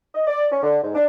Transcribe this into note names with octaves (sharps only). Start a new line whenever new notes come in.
D#5
D5
C#4
D3
G#2
D4